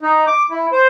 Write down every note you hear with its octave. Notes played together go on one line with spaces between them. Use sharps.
D#4
D6
E4
C5